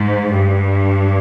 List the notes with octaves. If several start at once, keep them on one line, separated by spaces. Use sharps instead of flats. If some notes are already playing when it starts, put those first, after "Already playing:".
Already playing: G#2
G2